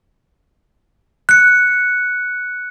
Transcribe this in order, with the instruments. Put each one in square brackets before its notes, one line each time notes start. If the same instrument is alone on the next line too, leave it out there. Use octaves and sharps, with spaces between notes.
[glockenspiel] F#6 C#7